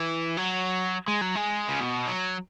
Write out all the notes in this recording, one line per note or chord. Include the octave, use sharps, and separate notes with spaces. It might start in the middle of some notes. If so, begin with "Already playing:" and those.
Already playing: E3
F#3
G#3
F#3
G#3
C#3
B2
F#3